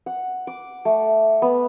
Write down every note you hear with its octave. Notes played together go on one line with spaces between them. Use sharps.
F#5
D6
A3
B3